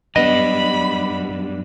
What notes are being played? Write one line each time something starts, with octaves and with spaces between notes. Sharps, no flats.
F#2 G3 B3 D4 D#5 B5